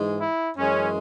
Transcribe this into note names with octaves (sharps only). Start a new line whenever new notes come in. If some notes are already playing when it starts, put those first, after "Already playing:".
Already playing: G#2 E3 G#3
E4
F#2 E3 G#3 C#4